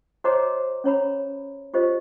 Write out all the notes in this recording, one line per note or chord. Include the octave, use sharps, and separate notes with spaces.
F#4 C5 C#5 D#5 A#5 D6
C#4 C#5 A#5 B5
F4 G4 C5 D#5